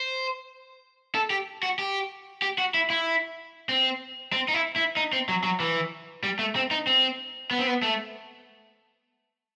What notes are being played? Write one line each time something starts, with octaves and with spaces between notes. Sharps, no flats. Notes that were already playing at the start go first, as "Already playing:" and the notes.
Already playing: C5
A4
G4
F#4
G4
G4
F#4
E4
E4
C4
C4
D#4
E4
E4
D#4
C4
F#3
F#3
E3
G3
A3
C4
D#4
C4
B3
C4
B3
A3